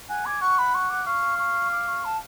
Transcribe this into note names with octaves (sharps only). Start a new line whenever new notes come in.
F#5 G#5
G#5 D6
F#5 C#6
B5
C#6
D6
F5 C#6
C#6
D6
C#6
A5